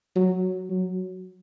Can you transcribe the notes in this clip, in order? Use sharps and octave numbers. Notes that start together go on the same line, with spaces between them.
F#3
F#3